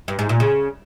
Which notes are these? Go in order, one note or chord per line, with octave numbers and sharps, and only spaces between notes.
G2
G#2
A#2
C#3